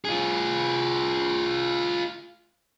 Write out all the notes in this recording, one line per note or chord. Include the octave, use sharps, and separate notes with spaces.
F4 G#4